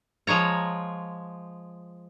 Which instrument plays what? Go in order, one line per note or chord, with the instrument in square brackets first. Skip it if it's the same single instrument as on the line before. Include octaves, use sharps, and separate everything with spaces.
[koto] F3 G#3 C#5 A#5